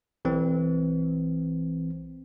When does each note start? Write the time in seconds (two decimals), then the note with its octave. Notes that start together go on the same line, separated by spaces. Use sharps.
0.25 B1 E3 C4